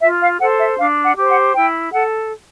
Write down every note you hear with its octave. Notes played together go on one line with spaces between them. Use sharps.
F4 E5
F5
A4 C5 F#5
E5
D4 F5
F#5
G4 C5
F#5
E4 G5
A4 F#5